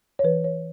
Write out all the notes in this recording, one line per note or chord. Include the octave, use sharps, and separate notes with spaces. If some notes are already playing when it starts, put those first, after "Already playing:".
C#5
E3 B4
C#5